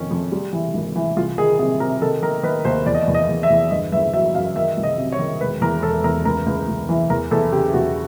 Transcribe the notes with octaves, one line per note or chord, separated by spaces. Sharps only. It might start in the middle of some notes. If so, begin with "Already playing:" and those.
Already playing: F2 D#3 C#4
F2
G3
E3
G#1
E3
C2 F4
D#3 G#4
C3 G#4
C3 A#4
D#3 A4
D#3 A#4
D#3 B4
D#2 C5
E2 D5
D#5
D5
E2
D#5
E2
E5
E2
G1 D#5
G1 E5
F#3 E5
F#2 F5
D#3 E5
C2
D#5
C3
C#5
D#3
E1 B4
E2 A#4
E1 A4
E2 A#4
C#2 A#4
C#2
C#2
E3
E2 A#4
E2 A4
C#3 G4
E2 F#4